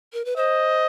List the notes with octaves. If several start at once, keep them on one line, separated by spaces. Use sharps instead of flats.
A#4
B4
C5 D#5